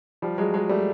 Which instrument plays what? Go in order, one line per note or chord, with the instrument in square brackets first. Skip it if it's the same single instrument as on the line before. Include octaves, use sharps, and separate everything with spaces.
[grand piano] F3 G3
F#3 G#3
F#3 G#3
G3 A3